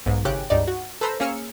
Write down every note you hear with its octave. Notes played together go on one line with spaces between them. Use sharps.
B1 G#2
G#1 C#3 C#4 G4 F#6 D7
C#2 G2 D#4 D5
F#4
A4 B4 C5 A#5 B5 E6
A#3 C#4 G#4 E6 F6 C#7